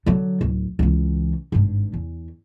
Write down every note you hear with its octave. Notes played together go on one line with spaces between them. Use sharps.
D3 F#3
D1
C#2 E3
G#1 G2
E2